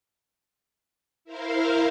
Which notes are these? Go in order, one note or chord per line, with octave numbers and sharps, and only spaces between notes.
E4 A#4 C5 F5